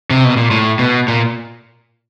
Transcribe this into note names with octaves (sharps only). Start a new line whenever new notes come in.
C3
B2
A#2
A2
B2
A#2